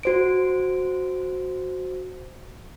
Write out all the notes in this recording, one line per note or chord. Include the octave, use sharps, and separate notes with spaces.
F#4 C5 D7